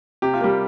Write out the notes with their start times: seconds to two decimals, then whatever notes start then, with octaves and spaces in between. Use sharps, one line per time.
0.22 C3 G4
0.33 F4
0.41 G3 A#3 G4